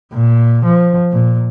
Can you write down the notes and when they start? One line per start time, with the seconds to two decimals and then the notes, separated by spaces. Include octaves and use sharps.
0.13 A#2
0.65 F3
1.12 A#2